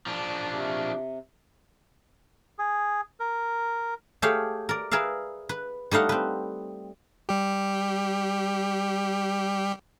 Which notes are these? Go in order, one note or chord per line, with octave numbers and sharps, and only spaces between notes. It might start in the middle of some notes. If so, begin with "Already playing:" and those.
F3 D4
C3
G#4
A#4
A3 G4 G#4 C#5 F5
A#4 D5
G#4 A#4 B4 E5 F5
B4
G3 A3 D#4 F5 F#5
C4 B4
G3 G4